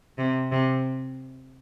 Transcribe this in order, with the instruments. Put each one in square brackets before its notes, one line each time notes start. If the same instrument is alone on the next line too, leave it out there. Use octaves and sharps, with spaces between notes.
[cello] C3
C3